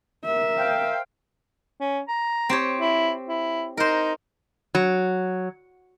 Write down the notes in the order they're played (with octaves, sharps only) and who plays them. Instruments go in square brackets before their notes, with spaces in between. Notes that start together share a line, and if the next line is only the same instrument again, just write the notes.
[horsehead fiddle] A#4 E5
[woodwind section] C5 F5 G5
[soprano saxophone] C#4
A#5
[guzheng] C4 G4 C#5
[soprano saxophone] E4
E4
[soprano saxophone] D#4 [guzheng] A#4 C5
[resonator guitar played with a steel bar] F#3